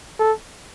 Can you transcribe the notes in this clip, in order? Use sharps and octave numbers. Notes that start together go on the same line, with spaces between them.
A4